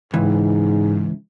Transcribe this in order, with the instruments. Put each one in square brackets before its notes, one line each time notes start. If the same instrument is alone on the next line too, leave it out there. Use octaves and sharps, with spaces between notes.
[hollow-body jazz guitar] C#2 E3 [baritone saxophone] G#2